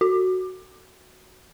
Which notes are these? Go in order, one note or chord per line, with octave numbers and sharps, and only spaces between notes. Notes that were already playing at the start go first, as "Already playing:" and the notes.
F#4